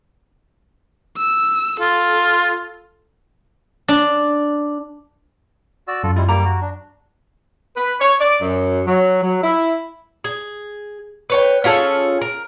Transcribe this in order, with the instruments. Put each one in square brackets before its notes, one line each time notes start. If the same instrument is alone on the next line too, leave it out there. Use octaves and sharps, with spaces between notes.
[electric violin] E6
[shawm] F4 [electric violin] A4
[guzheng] D4
[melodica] F#4 D5 E6
[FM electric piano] F#2 [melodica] F4 A4
[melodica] G3 G#3 E4 [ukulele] F4
[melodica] G3 A#3 D6 [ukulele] A#5
[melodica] F#4
D4
[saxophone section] B4
C#5
D5
F#2
F#3
F#3
E4
[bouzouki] G#4
B4 C#5 G5
C#4 F4 G#4 A4
A#4